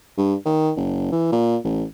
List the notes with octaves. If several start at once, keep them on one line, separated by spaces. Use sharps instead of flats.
G2
D#3
F#1
E3
A#2
A1